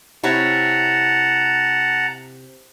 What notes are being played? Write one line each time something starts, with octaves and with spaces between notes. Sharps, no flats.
C3 E4 C#5 F#5 A5 A#5